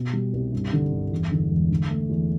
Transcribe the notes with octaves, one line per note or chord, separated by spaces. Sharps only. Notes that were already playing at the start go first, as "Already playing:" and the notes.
Already playing: B2
G3
C2
G2
D3
G1
E2
D3
E1
D3
A3
E2